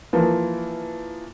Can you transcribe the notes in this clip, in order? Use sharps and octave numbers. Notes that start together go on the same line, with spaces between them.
E3 F3 A#3